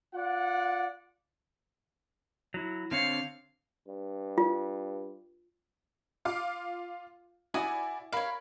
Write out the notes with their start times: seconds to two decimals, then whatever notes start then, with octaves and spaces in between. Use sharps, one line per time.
0.15 F4 D5 F#5
2.54 F#3 E4
2.91 D3 C4 C#5 F5
3.88 G2
4.38 F4
6.25 F4 F5 D6
7.54 E4 F#4 D5 G#5 D#6
8.12 A#4 C#5 F5 B5